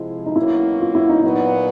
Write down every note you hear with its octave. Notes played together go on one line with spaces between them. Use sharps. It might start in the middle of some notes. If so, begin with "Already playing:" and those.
Already playing: C3 F3 G#3 E4
D#4
B2 F#3 A#3 C#4 E4
F4
E4
D#4
A#2 F#3 B3 D#4